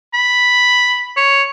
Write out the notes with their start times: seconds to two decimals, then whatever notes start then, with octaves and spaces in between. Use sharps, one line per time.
0.14 B5
1.17 C#5